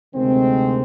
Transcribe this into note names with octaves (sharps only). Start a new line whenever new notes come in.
D2 C3 D#3 G#3 C4